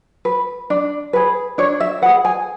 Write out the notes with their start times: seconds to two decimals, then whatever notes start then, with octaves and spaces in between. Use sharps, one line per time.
0.25 B4
0.70 D4
1.13 G#4 B4
1.58 D4 C#5
1.80 E5
2.02 B4 F#5
2.05 G#4
2.25 G#5